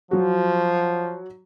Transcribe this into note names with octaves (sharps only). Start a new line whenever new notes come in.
F3 F#3 F#4